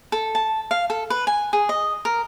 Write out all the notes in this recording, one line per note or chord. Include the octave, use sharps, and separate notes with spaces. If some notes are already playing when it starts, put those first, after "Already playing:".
A4
A5
F5
A4
B4
G#5
G#4
D#5
A#4